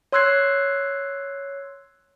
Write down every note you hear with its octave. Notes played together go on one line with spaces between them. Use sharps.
C#5 C6 E6 F#6 G#6 C7